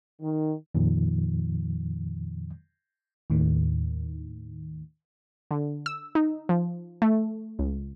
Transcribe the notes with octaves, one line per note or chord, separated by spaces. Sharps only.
D#3
F2 A#2 D#3 F3
D#2 A2 D#3
D3
E6
D#4
F3
A3
C#2